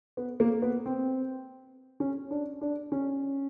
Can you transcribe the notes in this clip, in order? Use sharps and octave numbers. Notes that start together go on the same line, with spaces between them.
B3
A#3
B3
C4
C#4
D4
D4
C#4